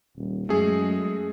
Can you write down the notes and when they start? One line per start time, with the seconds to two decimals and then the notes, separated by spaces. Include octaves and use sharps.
0.16 D#1
0.49 F#2 G#3 A3 G#4